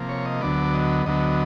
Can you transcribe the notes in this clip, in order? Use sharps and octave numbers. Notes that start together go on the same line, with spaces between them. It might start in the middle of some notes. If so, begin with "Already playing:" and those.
Already playing: C3 F3 A#3
C#5
D#5
D2 D3 F#3 B3 D5
D#5
D2 D3 F#3 B3 D#5